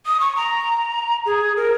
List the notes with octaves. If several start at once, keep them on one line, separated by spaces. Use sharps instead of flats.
D#6
C#6
A#5
G#4
A#4